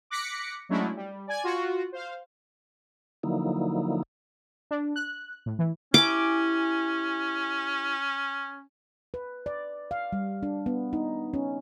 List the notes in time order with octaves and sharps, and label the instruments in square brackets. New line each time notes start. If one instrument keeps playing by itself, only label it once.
[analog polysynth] D6 F#6 A#6 B6 C#7
F#3 G#3 A3 C#4 D4 E4
G3
D5 G#5 G#6
F4 F#4
C5 F5
[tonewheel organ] D3 F3 F#3 A#3 D#4 E4
[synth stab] D4
F#6
A2
E3
[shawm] C#4 [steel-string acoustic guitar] E4 G4 G#5 [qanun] D6
[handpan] B4
D5
F5
G3
D4
B3
D#4
C#4